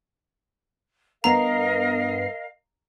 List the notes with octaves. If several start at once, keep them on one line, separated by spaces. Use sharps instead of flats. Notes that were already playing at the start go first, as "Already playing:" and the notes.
G2 B3 A#4 D#5 F5 A#5 C7